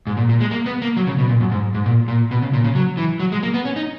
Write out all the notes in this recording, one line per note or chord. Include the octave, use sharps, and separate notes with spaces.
G#2
A#2
A#2
G#3
A#3
B3
A#3
F#3
C#3
B2
A#2
F#2
G#2
G#2
A#2
A#2
B2
C#3
A#2
C#3
F#3
E3
F#3
G#3
A#3
B3
C#4
D#4